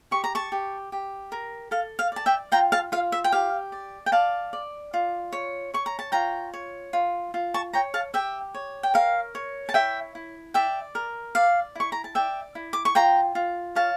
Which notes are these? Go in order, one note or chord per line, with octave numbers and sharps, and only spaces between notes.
G4 C#6
A#5
A5 C#6
G4
G4
A#4
A4 F5
F5
D5 A5
E5 G5
F4 G5 A#5
F5 A5
F4 F5
E5
G5
G4 F5
D5
G5
D5 F5 A5
D5
F4
C#5
C#5 C#6
A#5
A5
F4 G5 A#5
C#5
F4
F4
A5 C#6
C#5 G5 A#5
F5 A5
G4 E5 G5
C#5
G5
A#4 F5
C#5
A5
E4 E5 G5
E4
D5 E5 G5
A#4
D5 F5
E4 C#6
A#5
A5
D5 E5 G5
E4
D6
C#6
F4 G5 A#5
F4
C#5 F5 A5